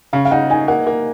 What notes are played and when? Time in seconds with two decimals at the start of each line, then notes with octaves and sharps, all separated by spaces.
0.13 C#3 F5
0.25 F5
0.31 D#4 F#5
0.50 D#4 G#5
0.68 A#3 F#5
0.87 A#3